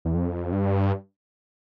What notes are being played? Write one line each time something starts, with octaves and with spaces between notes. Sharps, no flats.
E2
F2
G2